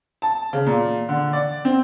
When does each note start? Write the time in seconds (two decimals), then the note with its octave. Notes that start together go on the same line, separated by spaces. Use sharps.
0.22 A5
0.53 C#3
0.66 A#2
1.09 D3
1.33 D5
1.65 C4